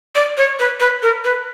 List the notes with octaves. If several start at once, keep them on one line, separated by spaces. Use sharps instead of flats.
D5
C#5
B4
B4
A#4
B4